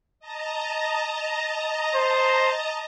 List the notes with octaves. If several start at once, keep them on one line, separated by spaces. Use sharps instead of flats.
D#5 A5 A#5
C5